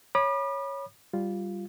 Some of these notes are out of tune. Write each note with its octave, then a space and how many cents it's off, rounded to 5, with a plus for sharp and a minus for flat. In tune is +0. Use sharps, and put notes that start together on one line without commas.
C#5 +0 B5 -25 D6 +45
G3 +0 F4 +0